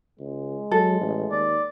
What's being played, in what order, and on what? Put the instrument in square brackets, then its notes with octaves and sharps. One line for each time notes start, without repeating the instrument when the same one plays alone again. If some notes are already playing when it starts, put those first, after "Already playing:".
[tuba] C#2 [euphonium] G#3
[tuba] F#3 [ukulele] A4
[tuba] A1
[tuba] D#2 [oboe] D5